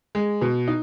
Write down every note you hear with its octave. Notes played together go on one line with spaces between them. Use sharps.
G#3
B2
D#4